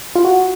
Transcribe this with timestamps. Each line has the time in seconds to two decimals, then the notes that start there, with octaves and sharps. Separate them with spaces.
0.16 F4
0.25 F#4